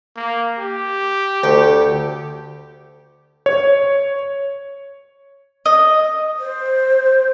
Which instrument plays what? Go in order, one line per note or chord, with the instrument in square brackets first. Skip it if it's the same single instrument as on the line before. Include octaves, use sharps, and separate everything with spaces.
[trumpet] A#3
G4
[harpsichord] D2
[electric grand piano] C#5
[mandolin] D#5
[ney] C5